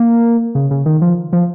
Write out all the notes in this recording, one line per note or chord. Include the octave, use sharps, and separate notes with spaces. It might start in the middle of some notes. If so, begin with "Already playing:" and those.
Already playing: A#3
C#3
C#3
D#3
F3
F3